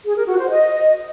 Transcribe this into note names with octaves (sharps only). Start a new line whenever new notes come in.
G#4
A#4
F#4
C5
D#5